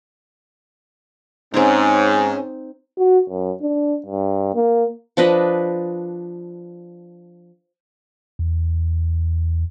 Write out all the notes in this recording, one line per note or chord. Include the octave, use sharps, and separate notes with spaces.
G#2 C4 C#4 D#4
F#4
F#2
D4
G2
A#3
F3 D4 B4 D#5
E2